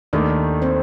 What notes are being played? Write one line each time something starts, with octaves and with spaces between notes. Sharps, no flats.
D#2 D#3 A3 D4 D5
C4 C5